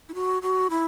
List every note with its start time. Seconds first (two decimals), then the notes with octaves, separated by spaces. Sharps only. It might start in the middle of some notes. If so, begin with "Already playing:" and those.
0.09 E4
0.15 F#4
0.42 F#4
0.70 E4